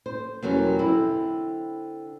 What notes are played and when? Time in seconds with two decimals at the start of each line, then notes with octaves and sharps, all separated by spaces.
0.06 C5
0.43 E2 B2 F#3 G3 C#4 A#4
0.79 D3 C4 E4